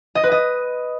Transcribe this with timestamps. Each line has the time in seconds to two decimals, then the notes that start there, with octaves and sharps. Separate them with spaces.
0.15 D#5
0.23 B4
0.32 D#5